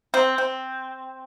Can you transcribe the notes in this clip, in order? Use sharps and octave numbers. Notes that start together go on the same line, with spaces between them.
C4
C4